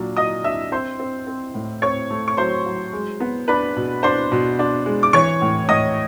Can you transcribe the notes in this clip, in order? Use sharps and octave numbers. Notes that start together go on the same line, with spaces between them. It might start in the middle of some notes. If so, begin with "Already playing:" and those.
Already playing: A#2 F#3 D4
F#3 D#5 D#6
D4 E5 E6
C4 C5 C6
C4
C4
A2
C4 C#5 C#6
A3
C#6
F#3 C5 C6
F#3
G#3
B3
D4 B4 B5
B2
D4 C5 C6
B2
D4
G#3
D6
E3 C#5 C#6
A2
A2 D#5 D#6